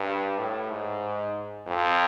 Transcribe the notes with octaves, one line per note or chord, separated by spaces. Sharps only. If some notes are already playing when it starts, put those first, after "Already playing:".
Already playing: G2
A2
G#2
F2